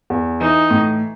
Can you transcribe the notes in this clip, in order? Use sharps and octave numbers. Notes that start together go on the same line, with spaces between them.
E2
E3 D#4
A2